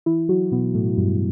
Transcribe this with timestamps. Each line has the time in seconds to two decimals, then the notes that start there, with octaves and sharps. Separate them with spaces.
0.06 E3 E4
0.29 F#3 F#4
0.52 B2 B3
0.74 A2 A3
0.98 G2 G3